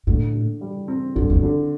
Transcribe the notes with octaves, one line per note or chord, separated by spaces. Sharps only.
A2 D3
D3
G3
C4
G2 D3
E2
G2
D3